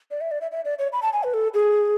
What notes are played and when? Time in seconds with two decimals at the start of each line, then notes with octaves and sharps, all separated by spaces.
0.11 D5
0.21 E5
0.31 D5
0.41 E5
0.52 E5
0.65 D5
0.79 C#5
0.93 B5
1.02 A5
1.13 G#5
1.23 B4
1.34 A4
1.54 G#4